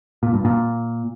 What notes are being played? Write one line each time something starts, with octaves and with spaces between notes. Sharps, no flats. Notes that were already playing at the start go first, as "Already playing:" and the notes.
A#2
G2
A#2